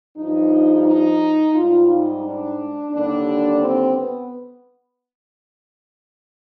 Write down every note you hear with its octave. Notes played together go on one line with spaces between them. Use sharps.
G2 F3 D#4
D#4
G#2 G3 F4
D#4
D4
D#2 D3 G3 D4
C4
B3